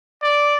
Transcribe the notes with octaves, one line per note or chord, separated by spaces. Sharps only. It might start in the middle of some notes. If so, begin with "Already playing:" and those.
D5